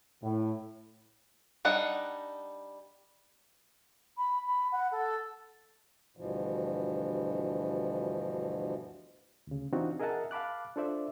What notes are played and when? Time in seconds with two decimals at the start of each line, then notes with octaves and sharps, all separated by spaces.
0.23 A2
1.65 G3 D4 D#4 D#5 F#5
4.17 B5
4.47 B5
4.71 F#5
4.91 A4
6.17 D2 G2 B2 E3 F3
9.47 D2 C#3
9.73 E3 C4 D4 D#4 F4 F#4
10.00 G#4 A#4 D#5 E5 F#5 A5
10.31 F5 A5 B5 D6 F#6
10.76 D4 F4 A4 C5 D5 E5